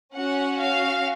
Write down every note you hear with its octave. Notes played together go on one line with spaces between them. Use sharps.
C#4 F#4 F#5
F5